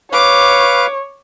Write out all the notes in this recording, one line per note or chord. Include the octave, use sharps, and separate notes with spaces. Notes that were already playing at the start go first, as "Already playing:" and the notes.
B4 C#5 F5 D6